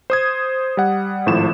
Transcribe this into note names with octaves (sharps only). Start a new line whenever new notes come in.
C5 D#6 G#6
G3 F#5
G#1 A2 F3 E7